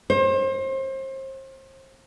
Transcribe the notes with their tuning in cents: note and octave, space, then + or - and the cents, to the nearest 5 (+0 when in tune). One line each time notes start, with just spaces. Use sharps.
C5 +35